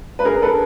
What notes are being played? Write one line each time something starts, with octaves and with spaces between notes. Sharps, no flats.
B4
G#4 A#4
A4 B4